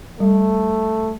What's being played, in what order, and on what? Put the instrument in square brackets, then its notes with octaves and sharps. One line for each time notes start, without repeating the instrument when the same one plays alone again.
[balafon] G3 [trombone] A3